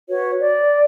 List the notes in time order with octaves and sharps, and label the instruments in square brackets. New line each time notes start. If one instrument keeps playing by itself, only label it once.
[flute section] F#4 B4 C#5
D5